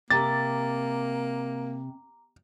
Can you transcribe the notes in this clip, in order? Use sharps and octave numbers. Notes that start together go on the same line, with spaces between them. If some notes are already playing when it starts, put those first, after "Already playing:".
C3 A#3 A#5 D6 A6